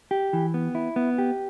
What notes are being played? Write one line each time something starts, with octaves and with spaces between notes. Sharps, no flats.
G4
E3
B3
E4
B3
G4